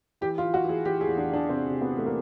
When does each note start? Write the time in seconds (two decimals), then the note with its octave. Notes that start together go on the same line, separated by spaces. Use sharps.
0.21 E3 G4
0.38 F4
0.43 E3
0.54 F#4
0.64 E3 G#4
0.85 E3 G4
1.01 G#4
1.07 E2
1.18 D4
1.28 E2
1.33 D4
1.49 C3 C4
1.70 C3
1.81 B3
1.92 E3
1.98 A3
2.06 A#3